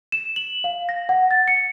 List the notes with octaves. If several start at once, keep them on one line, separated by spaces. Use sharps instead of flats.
E7
F#7
F5
A#6
F#5
A6
C#7